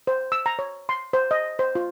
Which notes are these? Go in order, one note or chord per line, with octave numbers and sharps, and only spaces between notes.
C5
E6
A#5
C#5
C6
C5
D#5
C5
F4